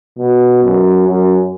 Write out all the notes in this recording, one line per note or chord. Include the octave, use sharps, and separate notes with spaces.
B2
F#2
F#2